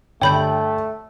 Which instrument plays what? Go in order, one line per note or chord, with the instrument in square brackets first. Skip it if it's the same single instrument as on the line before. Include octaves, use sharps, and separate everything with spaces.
[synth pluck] G2 D3 [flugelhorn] A3 [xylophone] C#5 B5 G6 [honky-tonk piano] G5